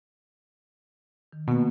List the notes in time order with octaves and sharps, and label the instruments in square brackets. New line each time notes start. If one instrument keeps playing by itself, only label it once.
[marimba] D#3
[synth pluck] B2 [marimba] A#3 B3